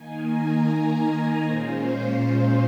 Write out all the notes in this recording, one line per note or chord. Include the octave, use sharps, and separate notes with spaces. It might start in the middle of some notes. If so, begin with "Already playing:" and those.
Already playing: D#3 A#3 D#4 G#5
A#5
A#5
A#2 G#3 C#4 F4 C5